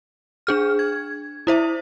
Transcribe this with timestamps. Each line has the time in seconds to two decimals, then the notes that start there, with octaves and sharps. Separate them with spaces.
0.47 D4 G#4 F6
0.79 G#6
1.47 E4 C5 E5